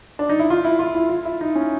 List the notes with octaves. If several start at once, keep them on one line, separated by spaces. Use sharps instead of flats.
D4
D#4
E4
F4
E4
F4
E4
F4
E4
D#4
C#4